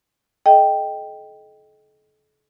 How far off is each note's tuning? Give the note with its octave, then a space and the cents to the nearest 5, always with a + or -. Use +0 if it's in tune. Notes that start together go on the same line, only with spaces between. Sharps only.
A4 -40 D#5 +0 G5 +0